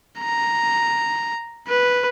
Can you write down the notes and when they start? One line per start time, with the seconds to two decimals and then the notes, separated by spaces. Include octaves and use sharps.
0.21 A#5
1.69 B4